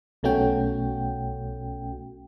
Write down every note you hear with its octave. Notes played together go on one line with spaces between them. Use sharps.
B1 B2 A3 C#4 F#4 G5